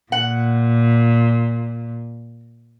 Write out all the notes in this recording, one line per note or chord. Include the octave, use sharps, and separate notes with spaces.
A#2 F#5